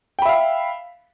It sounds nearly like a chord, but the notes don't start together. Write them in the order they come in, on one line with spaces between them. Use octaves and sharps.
G5 B5 E5 F5